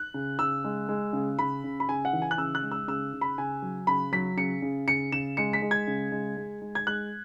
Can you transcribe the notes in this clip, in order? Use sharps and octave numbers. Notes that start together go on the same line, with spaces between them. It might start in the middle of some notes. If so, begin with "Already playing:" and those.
Already playing: F#6
C#3
C#3 E6
G#3
G#3
C#3
C#3 B5
C#3
B5
C#3 G#5
F#5
E3
G#5
F#6
C#3 E6
F#6
G#3
E6
C#3 E6
C#3
B5
C#3 G#5
F#3
C#3 B5
F#3 B6
C#3 C#7
C#3
C#3 C#7
C#3 E7
G#3 C#7
B6
G#3
G#6
C#3
G#3
G#3
G#3
G#6
G#3 F#6